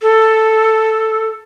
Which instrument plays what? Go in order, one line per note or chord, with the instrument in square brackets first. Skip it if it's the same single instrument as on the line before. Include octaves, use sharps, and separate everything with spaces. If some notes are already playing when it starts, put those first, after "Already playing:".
[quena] A4